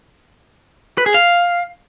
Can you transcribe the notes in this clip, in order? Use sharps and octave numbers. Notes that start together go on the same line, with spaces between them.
B4
G#4
F5